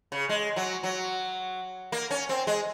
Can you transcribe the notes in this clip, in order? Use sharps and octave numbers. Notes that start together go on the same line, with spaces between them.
C#3
G#3
F#3
F#3
A#3
C#4
C4
G#3